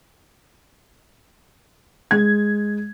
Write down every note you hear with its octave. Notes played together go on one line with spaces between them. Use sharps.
G#3 G#6